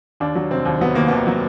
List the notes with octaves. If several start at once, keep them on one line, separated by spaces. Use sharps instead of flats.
D#2 D4
F#3
F1 C4
D#2
F#3 B3
D#3 A#3
D#2 B3
F#3